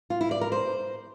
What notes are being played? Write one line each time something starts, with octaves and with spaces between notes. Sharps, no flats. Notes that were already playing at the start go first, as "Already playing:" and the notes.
F4
E4
D5
A#4
C5